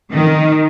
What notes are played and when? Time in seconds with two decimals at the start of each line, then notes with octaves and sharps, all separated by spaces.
0.11 D#3